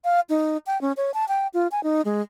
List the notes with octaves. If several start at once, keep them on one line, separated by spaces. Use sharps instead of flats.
F5
D#4
G5
C#4
C#5
A5
G5
F4
G#5
D#4
G#3